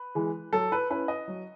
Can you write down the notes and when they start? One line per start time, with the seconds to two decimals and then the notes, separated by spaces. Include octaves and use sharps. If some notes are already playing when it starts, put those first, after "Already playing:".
Already playing: B4
0.15 E3 G#3
0.53 F#3 A4
0.72 B4
0.90 C#4 E4 B4
1.08 D#5
1.28 F#3